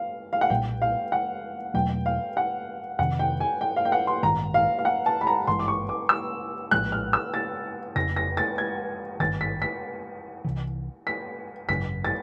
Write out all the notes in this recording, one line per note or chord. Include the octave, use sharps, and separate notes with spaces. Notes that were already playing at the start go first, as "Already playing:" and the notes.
Already playing: F5
F5
F#5
B1 A#2 G3 A#3 G5
F5
F#5
E2 B2 F#3 A3 G5
F5
F#5
F2 C3 D#3 F#5
G5
G#5
G5
F5
G5
F#5
C6
A1 G2 D#3 G#3 A#5
F5
F5
F#5
A5
B5
A#5
G#1 G2 E3 G#3 C6
D6
C#6
D6
E6
A#1 A2 F3 G#3 F#6
F6
E6
A6
F1 F2 C#3 A#6
A#6
A6
G#6
G#1 G2 D#3 A6
B6
B6
C2 C3 E3
B6
G#1 F#2 C#3 B6
A6